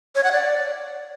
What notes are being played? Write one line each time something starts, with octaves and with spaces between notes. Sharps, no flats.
C#5
F#5
D5